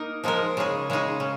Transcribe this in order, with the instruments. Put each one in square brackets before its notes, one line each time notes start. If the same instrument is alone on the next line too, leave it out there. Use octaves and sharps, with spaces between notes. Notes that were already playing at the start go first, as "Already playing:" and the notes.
Already playing: [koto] A#3 D#4 A#4
F3 G#3 D#4 A#4
C#3 G#3 D#4 G#4
C#3 G#3 D#4 G#4
C#3